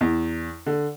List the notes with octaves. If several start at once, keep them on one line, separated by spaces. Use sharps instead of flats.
E2
D3